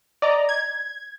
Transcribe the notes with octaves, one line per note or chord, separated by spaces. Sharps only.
D5 D#5 A#5
G#6